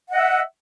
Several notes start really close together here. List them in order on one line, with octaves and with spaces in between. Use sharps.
F#5 D#5 E5